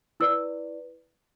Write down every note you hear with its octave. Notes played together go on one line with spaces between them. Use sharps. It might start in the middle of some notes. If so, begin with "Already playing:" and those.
E4 B4 D5 E6